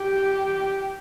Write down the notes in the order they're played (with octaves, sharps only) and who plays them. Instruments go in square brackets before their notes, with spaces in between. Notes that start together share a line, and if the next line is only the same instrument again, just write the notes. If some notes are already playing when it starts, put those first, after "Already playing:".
Already playing: [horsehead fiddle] G4